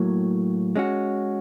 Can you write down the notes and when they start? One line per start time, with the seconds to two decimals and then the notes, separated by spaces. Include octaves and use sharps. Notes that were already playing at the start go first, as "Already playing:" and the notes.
Already playing: A2 F#3 A#3
0.76 G#3 C#4 F#4